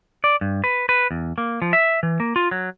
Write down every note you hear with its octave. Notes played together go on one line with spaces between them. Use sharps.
D5
G2
B4
B4
E2
A#3
F3
E5
E3
A#3
F4
F#3